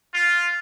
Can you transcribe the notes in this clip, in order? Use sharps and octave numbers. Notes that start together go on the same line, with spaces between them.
F4